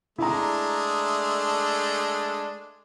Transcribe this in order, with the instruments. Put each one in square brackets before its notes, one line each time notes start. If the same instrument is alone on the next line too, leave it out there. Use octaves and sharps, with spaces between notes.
[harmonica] G#3 A3 D4 [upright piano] E4 A#5